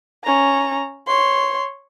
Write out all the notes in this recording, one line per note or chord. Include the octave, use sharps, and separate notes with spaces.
C#4 A#5
C#5 C6